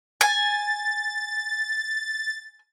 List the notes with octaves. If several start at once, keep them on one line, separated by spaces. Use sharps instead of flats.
G#5 A6